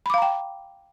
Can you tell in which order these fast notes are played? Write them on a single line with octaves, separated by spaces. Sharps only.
B5 D6 F5 A#5 G5